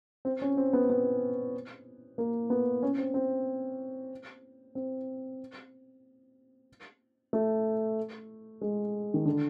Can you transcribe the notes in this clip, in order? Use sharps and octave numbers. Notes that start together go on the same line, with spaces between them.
C4
C#4
C4
B3
B3
A#3
B3
C#4
C4
C4
C4
A3
G#3
D#3
D3